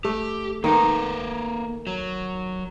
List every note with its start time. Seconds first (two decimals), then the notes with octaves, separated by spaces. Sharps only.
0.05 A3 G4
0.64 D#3 A#3 D#4 A#4 B4
1.87 F#3